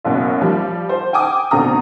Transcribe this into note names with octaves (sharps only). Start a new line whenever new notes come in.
F#1 F#2 B2
F3 G3
C5
G5 G#5 D6 D#6
F1 B2 D3 C4 A#5 D#6